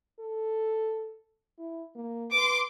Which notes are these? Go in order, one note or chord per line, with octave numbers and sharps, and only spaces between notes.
A4
E4
A#3
B4 C6 D6